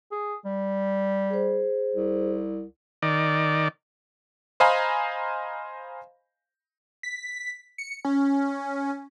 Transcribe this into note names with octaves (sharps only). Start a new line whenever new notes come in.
G#4
G3
G#4 C5
C2
D#3 D5
C5 D#5 F5 G#5 A#5 B5
B6
C#7
C#4